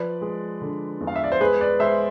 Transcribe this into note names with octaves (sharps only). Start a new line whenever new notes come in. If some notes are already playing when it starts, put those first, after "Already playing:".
Already playing: F3 B4 D5
G#3
D3
E2
F5
E5
D5
C5
G#3 G#4 B4
B4 D5
G#3 C5 E5